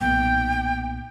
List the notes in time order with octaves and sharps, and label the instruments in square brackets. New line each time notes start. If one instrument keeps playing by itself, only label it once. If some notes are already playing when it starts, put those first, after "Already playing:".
[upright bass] B1 A#2 [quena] G5